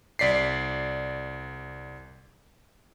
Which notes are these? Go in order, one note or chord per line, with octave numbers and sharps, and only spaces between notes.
C2 D5 B6 C7